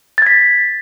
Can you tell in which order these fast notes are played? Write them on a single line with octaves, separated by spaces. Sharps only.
A6 G#6 B6